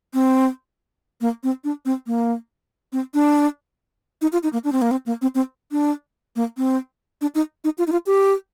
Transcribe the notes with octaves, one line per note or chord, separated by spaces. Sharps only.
C4
A#3
C4
D4
C4
A#3
C4
D4
D#4
F4
D#4
A#3
D4
C4
A#3
C4
A#3
C4
C4
D4
A#3
C4
D4
D#4
D#4
F4
D#4
F4
G4